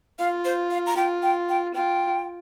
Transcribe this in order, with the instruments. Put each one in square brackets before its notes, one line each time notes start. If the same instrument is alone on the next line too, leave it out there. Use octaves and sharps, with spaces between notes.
[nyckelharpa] F4 [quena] F5
[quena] C5
F5
A#5
[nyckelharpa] F4 [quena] G5
[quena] G5
G5
[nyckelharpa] F4 [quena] G5